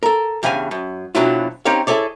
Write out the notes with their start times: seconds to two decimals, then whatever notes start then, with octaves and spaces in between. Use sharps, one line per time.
0.03 A4 A#4
0.43 E2 G2 C#3 F5 G#5
0.71 F#2
1.15 F2 B2 F#3 D4 E4 F4
1.65 C4 C#4 D#4 G4 C#5 F5
1.87 E4 G#4 A4 C#5 D5